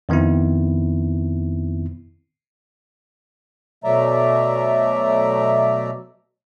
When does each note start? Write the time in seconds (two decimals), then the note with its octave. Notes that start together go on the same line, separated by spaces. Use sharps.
0.09 F2 D#3 B3 C4 E4
3.84 B2 F#3 A3 D5 E5 A#5